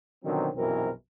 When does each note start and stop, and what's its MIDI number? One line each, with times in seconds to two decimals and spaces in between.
0.25 0.49 47
0.25 0.49 50
0.25 0.49 51
0.25 0.49 53
0.25 0.49 54
0.25 0.49 60
0.55 0.90 34
0.55 0.90 42
0.55 0.90 47
0.55 0.90 52
0.55 0.90 60
0.55 0.90 70